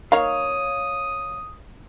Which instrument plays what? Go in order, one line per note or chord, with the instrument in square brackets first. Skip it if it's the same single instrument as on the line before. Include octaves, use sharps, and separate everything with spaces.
[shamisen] A#3 D#4 [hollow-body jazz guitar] C#5 F5 [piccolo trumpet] D#6